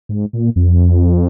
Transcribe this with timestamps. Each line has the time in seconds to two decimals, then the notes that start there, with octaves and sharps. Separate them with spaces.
0.09 G#2
0.33 A#2
0.56 F2